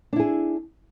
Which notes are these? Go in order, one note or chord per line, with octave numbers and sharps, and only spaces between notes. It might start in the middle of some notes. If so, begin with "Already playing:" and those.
D4 E4 G#4